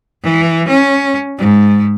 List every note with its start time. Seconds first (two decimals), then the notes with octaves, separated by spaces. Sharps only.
0.23 E3
0.68 C#4
1.38 G#2